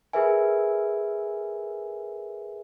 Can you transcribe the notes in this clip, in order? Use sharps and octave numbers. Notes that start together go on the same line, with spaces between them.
G#4 A#4 B4 E5 G#5